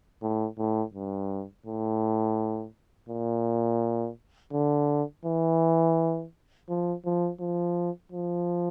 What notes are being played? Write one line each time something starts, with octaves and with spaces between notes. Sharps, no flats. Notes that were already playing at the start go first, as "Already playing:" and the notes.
A2
A2
G2
A2
A#2
D3
E3
F3
F3
F3
F3